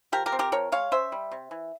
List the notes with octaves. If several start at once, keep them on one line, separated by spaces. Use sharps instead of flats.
F3 G4 A#4
G4 A#4
C4
G4 A#4
F3 A#4 C#5
G#3 C#5 F5
C#4 C5 E5
G3
C3
E3